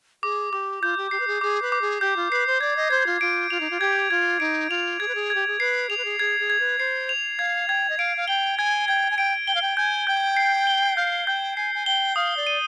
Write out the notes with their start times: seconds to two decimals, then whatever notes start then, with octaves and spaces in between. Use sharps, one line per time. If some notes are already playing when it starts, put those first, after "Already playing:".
0.23 G#4 D6
0.52 G4 D6
0.82 F4 G6
0.97 G4
1.11 G4 C7
1.20 B4
1.27 G#4
1.41 G#4 D6
1.62 B4
1.72 D6
1.81 G#4
2.01 G4 G6
2.16 F4
2.31 B4 C7
2.47 C5
2.61 D5 G#6
2.76 D#5
2.91 C5 G#6
3.06 F4
3.21 F4 D7
3.50 F4 F7
3.60 D#4
3.70 F4
3.80 G4 G#6
4.11 F4 G#6
4.40 D#4 D7
4.70 F4 F7
5.00 G#4 G#6
5.08 B4
5.15 G#4
5.30 G4 G#6
5.47 G#4
5.60 B4 C7
5.89 G#4 F7
5.97 B4
6.05 G#4
6.19 G#4 G#6
6.40 G#4
6.50 G#6
6.60 B4
6.78 C5 C7
7.09 F7
7.39 F5 G#6
7.68 G5 G#6
7.89 D#5
7.98 F5 D7
8.17 F5
8.28 G5 G7
8.58 G#5 G#6
8.88 G5 G#6
9.11 G#5
9.17 G5 D7
9.47 G5 G7
9.55 F5
9.62 G5
9.77 G#5 G6
10.07 G5 G6
10.37 C7
10.67 G7
10.97 F5 G6
11.27 G5 G6
11.56 G#5 C7
11.75 G#5
11.86 G5 G7
12.16 F5 D#6
12.37 D5
12.47 D#7